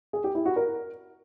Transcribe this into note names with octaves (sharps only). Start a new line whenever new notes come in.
G#4
G4
E4
F#4
A#4